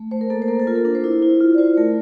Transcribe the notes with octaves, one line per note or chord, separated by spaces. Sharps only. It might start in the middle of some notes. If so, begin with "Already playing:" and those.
Already playing: A3
A3 C5
A#4
A#3 A4
C5
A#3 A#4
A4
F4 A#4
A4
D4 A#4
C5
E4
E4
F4
D5
F4 C5
A3 A#4